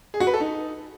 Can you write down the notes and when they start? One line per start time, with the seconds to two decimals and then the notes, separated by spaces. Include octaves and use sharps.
0.14 G#4
0.20 F#4
0.27 B4
0.34 A4
0.40 D#4